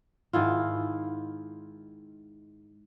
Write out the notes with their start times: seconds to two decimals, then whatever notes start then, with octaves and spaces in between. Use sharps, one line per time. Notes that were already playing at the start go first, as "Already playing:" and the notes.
0.33 G#2 D#3 E4 F4